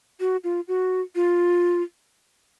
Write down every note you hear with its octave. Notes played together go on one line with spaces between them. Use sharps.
F#4
F4
F#4
F4